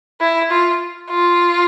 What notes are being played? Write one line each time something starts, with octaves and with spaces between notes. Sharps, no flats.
E4
F4
F4